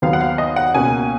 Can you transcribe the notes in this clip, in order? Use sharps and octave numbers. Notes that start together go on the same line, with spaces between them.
D#2 D#3 F#3 B3 F5
F#5
F5
D#5
F#5
C#2 B2 A#3 C#4 G#5